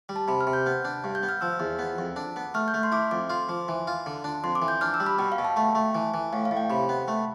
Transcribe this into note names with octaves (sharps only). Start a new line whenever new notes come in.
G3
A5
C3 B5
F6
C3
G6
B3 F6
D4
G2
G6
B3
F6
F3 E6
E2
B3
F2
D4
B3
A3 F6
G6
A3
C6
E4 D6
F2 D6
F4 C6
F3
E3
F4
D3
D4
F2 C6
D6
E3
G6
D4 F6
E6
G3
B5
B2 G5
F5
B2 G5
A5
A3 A5
A3
E3
E3
A2 F5
F5
A2
G5
C3 B5
B3
A3